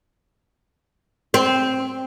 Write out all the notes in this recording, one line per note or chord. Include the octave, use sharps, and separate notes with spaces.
C4